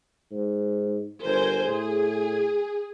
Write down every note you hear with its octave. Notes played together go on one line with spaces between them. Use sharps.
G#2
G1 A#4 C5 G#5
A2 G#4